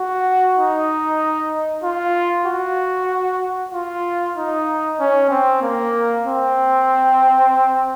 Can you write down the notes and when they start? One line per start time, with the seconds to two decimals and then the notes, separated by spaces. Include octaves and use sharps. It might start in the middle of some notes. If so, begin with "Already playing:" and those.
Already playing: F#4
0.57 D#4
1.84 F4
2.46 F#4
3.72 F4
4.37 D#4
5.00 C#4
5.31 C4
5.62 A#3
6.25 C4